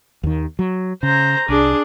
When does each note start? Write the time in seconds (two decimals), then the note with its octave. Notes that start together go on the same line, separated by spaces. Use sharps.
0.23 D#2 D#3
0.59 F#3
1.03 C#3 C5 A#5
1.49 C2 D4 G#4